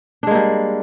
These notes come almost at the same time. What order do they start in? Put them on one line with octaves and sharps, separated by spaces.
D4 G#3 A#3 G3